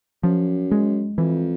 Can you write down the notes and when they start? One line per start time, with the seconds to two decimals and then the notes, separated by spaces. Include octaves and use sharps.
0.23 F#2 F3
0.71 G#3
1.18 F2 E3